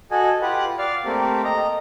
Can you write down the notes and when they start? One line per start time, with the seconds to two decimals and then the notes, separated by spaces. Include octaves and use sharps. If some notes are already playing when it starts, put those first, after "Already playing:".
0.11 F#4 A4 D#5 G#5
0.42 F4 G4 B4 F#5
0.79 D5 F5 F6
1.05 A3 A#3 C4 G4
1.44 D#5 A#5